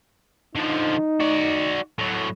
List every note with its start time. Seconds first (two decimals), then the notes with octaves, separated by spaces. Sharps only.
0.55 D3 F3 D#4
1.20 F#4 D5
1.99 A2 F#3